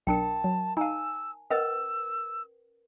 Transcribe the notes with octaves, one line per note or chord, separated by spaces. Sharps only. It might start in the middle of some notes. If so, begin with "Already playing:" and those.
B1 D4 A#4 G5 A5 C#7
F#3
D#4 F5 G#5 A5 E6
C#4 A#4 B4 D#5 F#5 E6 A6